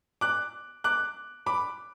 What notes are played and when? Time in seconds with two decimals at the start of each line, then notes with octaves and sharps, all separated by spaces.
0.21 D6 F#6
0.84 D6 F#6
1.46 B5 D6